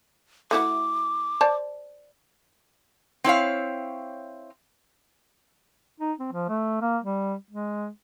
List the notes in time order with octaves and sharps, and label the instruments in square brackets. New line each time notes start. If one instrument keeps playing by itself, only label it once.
[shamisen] A3 E4 F#4 [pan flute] D6
[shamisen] C5 D5 A5
[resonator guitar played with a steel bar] C4 E4 C#5 F5
[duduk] D#4
C4
F3
A3
A#3
G3
G#3